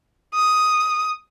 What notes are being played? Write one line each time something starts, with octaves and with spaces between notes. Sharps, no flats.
D#6